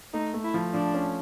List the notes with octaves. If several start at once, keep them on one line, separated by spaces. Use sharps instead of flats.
A3 D#4
A3
E4
F3
F3 D4
C#4